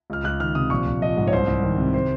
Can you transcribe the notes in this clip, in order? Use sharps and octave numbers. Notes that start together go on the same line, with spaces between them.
C#2 F6
C#2 F#6
D#3 F6
C3 D#6
A#1 C#6
A#1
F3 D#5
G#2
C#5
C2 C5
C2
D#3
C3
C5